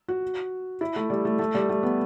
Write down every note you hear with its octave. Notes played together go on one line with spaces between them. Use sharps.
F#4
E4
A3
G3
A3
A3
G3
A3
B3